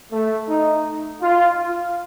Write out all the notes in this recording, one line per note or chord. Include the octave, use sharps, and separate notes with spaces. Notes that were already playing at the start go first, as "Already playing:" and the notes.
A3
D#4
F4